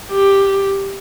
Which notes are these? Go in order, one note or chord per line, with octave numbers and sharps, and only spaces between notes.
G4